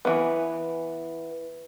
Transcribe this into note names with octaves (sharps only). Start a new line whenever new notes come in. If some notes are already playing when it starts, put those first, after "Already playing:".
E3 B3